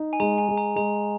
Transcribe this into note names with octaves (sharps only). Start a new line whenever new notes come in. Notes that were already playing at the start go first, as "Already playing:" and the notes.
Already playing: D#4
G#5
G#3 A#5
G#5
G#3
A#5
G#3 A#5